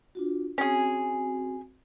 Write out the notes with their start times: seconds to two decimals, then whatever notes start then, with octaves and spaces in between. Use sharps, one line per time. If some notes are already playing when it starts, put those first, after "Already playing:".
0.15 D4 F4 F#4
0.58 C4 C#4 F#4 G#4